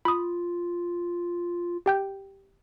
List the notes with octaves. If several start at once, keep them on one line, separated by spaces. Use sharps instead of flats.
F4 B5 D#6
G4 G5 G6